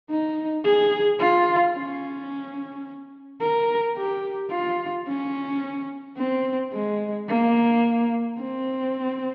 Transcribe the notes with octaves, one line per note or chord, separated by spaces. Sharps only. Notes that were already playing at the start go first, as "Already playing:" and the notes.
D#4
G#4
F4
C#4
A#4
G4
F4
C#4
C4
G#3
A#3
C4